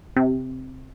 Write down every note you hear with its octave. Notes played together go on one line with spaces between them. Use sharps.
C3